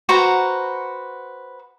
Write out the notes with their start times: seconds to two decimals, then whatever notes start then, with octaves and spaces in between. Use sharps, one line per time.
0.09 F#4 B4 C5 A#5